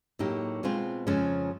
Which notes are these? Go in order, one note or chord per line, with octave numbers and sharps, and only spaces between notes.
A2 F#3 A#3 D#4 G4
B2 G#3 C4 F4
F2 C#3 F3 G#3 C#4